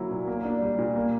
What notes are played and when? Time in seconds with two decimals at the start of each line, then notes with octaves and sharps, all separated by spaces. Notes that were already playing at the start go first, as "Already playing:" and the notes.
Already playing: D3 F#3 A#3 E4
0.11 A#2
0.27 A#3
0.45 D4
0.62 G3
0.78 A#2
0.96 A#3